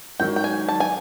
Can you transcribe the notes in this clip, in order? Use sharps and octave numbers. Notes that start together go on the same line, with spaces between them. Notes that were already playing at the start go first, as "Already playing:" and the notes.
G#2 D#3 F#3 G5
G5
G#5
A5
G#5